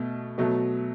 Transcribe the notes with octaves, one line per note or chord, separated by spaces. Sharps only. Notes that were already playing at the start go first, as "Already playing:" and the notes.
Already playing: B2 A3
B2 F#3 A3